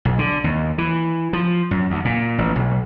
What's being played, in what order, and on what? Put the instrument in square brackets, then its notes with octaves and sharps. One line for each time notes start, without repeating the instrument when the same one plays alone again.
[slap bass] B1
D3
D#2
E3
F3
F#2
D2
A#2
A1
B1